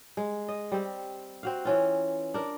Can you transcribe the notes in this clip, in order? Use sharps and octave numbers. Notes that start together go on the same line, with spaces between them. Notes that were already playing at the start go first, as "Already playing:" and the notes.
G#3
D#5
G3 C4
C4 F#4 F5
E3 C#4 F4
D4 A#4